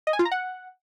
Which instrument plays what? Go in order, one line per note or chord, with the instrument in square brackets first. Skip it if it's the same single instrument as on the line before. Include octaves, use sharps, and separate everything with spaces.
[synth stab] D#5
G#5
F4
A#5
F#5